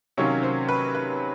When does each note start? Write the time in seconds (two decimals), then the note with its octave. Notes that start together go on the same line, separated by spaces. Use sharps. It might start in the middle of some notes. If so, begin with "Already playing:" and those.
0.17 C3 D#3 F#3 A#3 C#4 C#5
0.43 C5
0.69 B4
0.95 B4